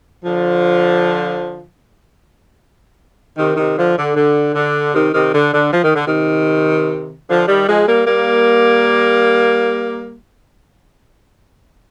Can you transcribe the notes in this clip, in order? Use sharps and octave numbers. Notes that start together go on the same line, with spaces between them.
D3 F3
C3 D#3
C3 D#3
D3 F3
D3
D3
D3
C3 D#3
C3 D#3
D3
D3
F3
D#3
D3
C3 D#3
D3 F3
D#3 G3
F3 G#3
G3 A#3
G3 A#3